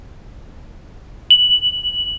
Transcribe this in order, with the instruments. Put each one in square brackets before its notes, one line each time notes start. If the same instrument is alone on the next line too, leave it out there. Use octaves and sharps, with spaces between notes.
[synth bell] F#7